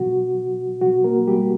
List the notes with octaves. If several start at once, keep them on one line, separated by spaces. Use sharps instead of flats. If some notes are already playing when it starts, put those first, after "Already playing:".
Already playing: B2 F#3 F#4
B2 F#3 F#4
A#3 A#4
G3 G4